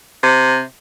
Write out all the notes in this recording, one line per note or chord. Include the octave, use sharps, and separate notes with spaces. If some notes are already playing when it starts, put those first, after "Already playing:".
C3